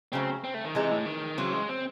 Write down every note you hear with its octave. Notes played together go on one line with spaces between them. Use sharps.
C#3 F#3 A3 C4
C4
A3
D#3
C3 E3 G#3 D#4
A2
D#3
C#3 E3 F#3 C4
G#3
C4